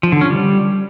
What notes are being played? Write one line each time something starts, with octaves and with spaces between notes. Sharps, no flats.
F3
D3
C#4
G3